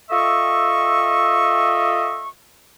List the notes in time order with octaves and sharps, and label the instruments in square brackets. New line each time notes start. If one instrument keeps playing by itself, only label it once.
[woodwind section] F4 A4 D#5 E5 C#6